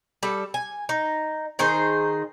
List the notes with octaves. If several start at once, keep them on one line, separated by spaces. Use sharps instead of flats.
G3 A4
G#5
D#4
D#3 D#4 G#4 C5